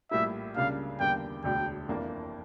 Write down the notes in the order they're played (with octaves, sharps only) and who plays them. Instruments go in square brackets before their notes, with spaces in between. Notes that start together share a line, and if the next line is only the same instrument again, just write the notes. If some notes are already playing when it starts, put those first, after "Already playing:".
[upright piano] A#1 A2 G3 A#3 E4 [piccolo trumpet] E5
[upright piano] C#2 C#3 G3 A#3 D4 [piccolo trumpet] F5
[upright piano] E2 D3 G3 A#3 [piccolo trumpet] G5
[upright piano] E1 D2 D3 [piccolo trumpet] G5
[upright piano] G1 F2 E3 A#3 D4